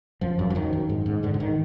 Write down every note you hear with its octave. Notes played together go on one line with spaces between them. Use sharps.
F#2 F3
F#2
F3
F#2 D#3
F#2
G#2
G#2
G#2 D3
D3
D#3